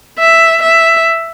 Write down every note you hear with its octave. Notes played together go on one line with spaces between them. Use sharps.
E5
E5